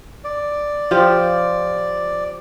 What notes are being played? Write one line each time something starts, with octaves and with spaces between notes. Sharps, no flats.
D5
F3 F4 G4